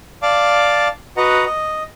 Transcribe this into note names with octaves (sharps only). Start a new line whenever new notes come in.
D5 F5 A5 D6
F#4 B4 D#5 F#5 A#5
D#5